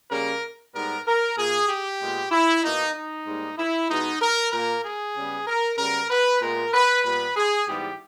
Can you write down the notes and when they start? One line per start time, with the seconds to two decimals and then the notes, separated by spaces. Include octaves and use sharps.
0.10 C#3 G3 A#3 A#4
0.74 G#2 G3 B3 A#4
1.06 A#4
1.37 A#2 A#3 G#4
1.68 G4
2.00 A#2 G#3 B3
2.31 E4
2.63 B2 A#3 D#4
2.95 D#4
3.27 G#2 G3 A#3
3.58 E4
3.90 B2 G#3 B3 D#4
4.21 A#4
4.52 A#2 A#3 A#4
4.84 G#4
5.16 C#3 G3 B3
5.47 A#4
5.78 C#3 G3 B3 A#4
6.10 B4
6.42 A#2 G#3 B3 A#4
6.74 B4
7.05 A#2 G3 B3 B4
7.36 G#4
7.68 G#2 E3 G3 B3 G4